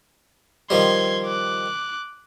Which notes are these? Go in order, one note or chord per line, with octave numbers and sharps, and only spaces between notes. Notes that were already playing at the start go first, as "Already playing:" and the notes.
D#3 F3 G3 C6 G#6
D6 F#6